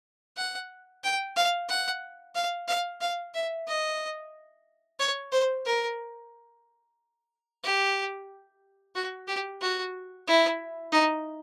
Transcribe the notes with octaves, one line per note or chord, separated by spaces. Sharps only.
F#5
G5
F5
F#5
F5
F5
F5
E5
D#5
C#5
C5
A#4
G4
F#4
G4
F#4
E4
D#4